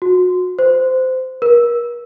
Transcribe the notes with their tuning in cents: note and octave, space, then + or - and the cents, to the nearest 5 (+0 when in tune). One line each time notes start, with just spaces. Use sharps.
F#4 -25
C5 -20
A#4 +35